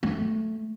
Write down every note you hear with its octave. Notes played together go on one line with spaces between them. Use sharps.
A3